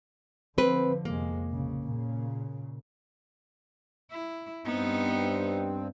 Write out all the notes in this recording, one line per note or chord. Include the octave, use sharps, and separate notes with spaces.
D3 F3 C4 B4
F2 C3 G#3 A#3
A#1 C#3
A#2 C#3
E4
G2 B3 C4 D#4